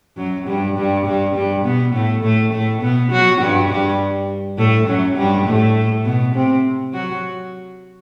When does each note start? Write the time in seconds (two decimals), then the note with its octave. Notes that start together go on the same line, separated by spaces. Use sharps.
0.17 F#2 F#3
0.47 G2 G3
0.77 G2 G3
1.06 G2 G3
1.35 G2 G3
1.65 B2 B3
1.94 A2 A3
2.24 A2 A3
2.53 A2 A3
2.81 B2 B3
3.12 F#3 F#4
3.41 G2 G3
3.70 G2 G3
4.58 A2 A3
4.88 F#2 F#3
5.17 G2 G3
5.47 A2 A3
6.05 B2 B3
6.35 C3 C4
6.94 F#3 F#4